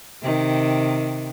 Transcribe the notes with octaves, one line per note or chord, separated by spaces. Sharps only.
C3 D#3